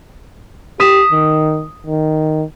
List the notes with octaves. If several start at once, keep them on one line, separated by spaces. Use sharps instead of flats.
G4 D#6 B6 E7
D#3
D#3